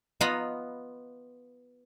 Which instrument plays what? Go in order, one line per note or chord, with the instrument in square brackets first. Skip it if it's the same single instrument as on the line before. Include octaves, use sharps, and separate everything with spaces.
[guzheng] B3 F4 D#5 F#5 A#5 B5